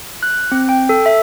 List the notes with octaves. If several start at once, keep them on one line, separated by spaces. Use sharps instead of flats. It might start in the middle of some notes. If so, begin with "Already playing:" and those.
F#6
C4
G5
A4
E5